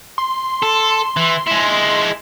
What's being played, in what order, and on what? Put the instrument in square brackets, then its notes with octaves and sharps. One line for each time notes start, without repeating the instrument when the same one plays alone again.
[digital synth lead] C6
[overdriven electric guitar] A4
E3
G#3 E4